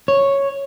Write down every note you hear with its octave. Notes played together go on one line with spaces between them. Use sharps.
C#5